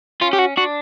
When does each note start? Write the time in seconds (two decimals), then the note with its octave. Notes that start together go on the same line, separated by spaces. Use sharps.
0.22 C#4 F4
0.33 G4
0.39 F#4
0.57 D4 F#4